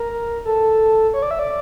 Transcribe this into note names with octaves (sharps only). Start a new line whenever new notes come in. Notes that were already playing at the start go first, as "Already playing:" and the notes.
Already playing: A#4
A4
C#5
D5
E5
D5